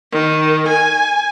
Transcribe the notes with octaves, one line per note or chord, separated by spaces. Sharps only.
D#3
G#5